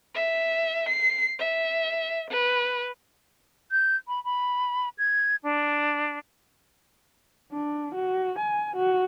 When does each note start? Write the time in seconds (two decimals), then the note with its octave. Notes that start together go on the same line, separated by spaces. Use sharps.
0.14 E5
0.89 C7
1.39 E5
2.30 B4
3.72 G6
4.08 B5
4.24 B5
4.98 G#6
5.43 D4
7.53 D4
7.95 F#4
8.39 G#5
8.76 F#4